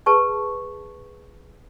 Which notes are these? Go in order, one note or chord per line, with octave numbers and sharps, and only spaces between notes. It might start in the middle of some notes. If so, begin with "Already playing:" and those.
G#4 B4 A5 C#6